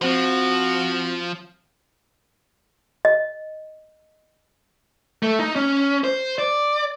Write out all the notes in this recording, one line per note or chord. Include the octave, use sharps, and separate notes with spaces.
F3 C4 F#4 C5
D#5
A3
D#4
C#4
C5
D5